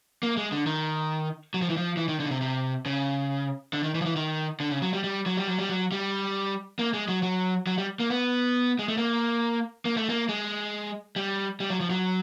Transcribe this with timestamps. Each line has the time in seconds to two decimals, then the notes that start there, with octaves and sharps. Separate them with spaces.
0.23 A#3
0.37 G#3
0.52 D3
0.66 D#3
1.54 F#3
1.62 F3
1.70 E3
1.77 F3
1.97 E3
2.08 D#3
2.20 D3
2.26 C#3
2.31 C3
2.41 C3
2.86 C#3
3.73 D3
3.83 D#3
3.95 E3
4.01 F3
4.05 E3
4.16 D#3
4.60 D3
4.71 C#3
4.82 F#3
4.93 G3
5.04 G3
5.26 F#3
5.37 G3
5.47 F#3
5.59 G3
5.70 F#3
5.92 G3
6.79 A#3
6.94 G#3
7.08 F#3
7.23 F#3
7.67 F#3
7.78 G3
8.00 A#3
8.10 B3
8.79 G#3
8.88 A3
8.97 A#3
9.85 A#3
9.97 A3
10.09 A#3
10.29 G#3
11.16 G3
11.60 G3
11.70 F#3
11.80 F3
11.90 F#3